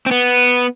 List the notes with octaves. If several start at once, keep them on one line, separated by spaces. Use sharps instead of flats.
C4
B3